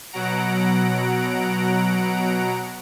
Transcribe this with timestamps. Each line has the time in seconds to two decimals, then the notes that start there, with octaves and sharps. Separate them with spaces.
0.12 B2 F#3 F#5 A#5 D7